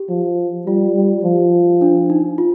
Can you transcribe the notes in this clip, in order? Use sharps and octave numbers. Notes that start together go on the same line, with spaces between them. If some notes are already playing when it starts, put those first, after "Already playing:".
Already playing: G4
F3
G3 F4
G3
F3
D4
D#4
F4